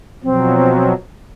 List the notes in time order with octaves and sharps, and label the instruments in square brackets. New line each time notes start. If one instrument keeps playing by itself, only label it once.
[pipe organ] B2 F3 F#3 [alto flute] C4